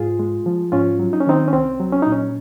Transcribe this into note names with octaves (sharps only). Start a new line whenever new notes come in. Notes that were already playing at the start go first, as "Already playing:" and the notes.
Already playing: G#2 F4 G#4
G#3
F3
G#2 C#4 F4
F#3
D#4
C#4
D#3 C4 D#4
C#4
C2 C4
F#3
C#4
A#2 D#4
C#4